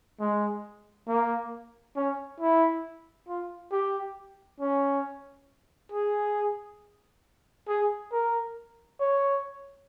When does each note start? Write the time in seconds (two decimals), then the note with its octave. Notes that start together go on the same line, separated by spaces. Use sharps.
0.20 G#3
1.08 A#3
1.96 C#4
2.40 E4
3.28 F4
3.72 G4
4.61 C#4
5.92 G#4
7.68 G#4
8.12 A#4
9.00 C#5